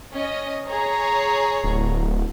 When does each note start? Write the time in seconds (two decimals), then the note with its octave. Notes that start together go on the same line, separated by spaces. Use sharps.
0.12 C#4 D#5
0.67 G#4 C#5 A#5
1.64 D1